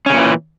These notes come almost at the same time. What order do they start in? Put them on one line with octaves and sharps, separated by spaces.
C#4 C#3 A#2 E3